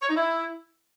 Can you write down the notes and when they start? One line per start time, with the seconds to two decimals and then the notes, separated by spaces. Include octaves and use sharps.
0.02 C#5
0.09 D#4
0.15 E4